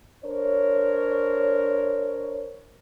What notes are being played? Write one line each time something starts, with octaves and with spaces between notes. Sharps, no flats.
D4 A#4 C5 C#5